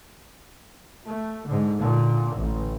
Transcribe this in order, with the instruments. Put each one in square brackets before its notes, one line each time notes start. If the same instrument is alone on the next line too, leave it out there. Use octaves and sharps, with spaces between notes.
[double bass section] A3
G#2 D3
A#2 D3
A1